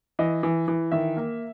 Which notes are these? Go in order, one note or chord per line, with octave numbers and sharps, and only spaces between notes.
E3 D#5
E3
E3
D#3 E5
A#3